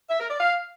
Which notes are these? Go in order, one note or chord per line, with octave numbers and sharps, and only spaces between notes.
E5
A#4
D5
F5